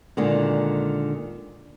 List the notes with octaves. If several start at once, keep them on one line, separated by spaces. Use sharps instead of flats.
A#2 D3 D#3 G#3